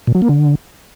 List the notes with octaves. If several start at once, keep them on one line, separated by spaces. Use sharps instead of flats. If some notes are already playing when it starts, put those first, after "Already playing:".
A#2
F#3
A#3
D3